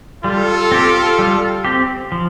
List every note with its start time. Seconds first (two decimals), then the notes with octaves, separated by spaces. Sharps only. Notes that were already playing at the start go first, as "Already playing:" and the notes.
0.24 G3 F4 A4
0.72 C4 G4
1.19 G3
1.65 C4 G4
2.12 F3